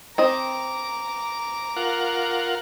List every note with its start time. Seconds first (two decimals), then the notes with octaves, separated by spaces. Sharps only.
0.18 C4 D#5 A#5 D6
1.76 F4 A#4 F#5